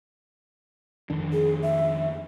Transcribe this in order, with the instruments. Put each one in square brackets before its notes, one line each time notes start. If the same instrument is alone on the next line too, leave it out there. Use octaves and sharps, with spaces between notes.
[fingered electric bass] F2 D#3 D4
[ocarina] G#4
E5